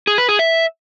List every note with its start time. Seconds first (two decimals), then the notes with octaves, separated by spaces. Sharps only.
0.07 G#4
0.18 B4
0.29 G#4
0.39 E5